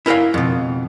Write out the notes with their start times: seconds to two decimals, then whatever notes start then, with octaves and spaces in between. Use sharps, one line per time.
0.06 E4 A#4 B4 C#5 F5
0.34 F2 B2